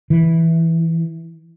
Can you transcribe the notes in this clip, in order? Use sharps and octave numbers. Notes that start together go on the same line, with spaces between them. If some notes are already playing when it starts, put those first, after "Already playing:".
E3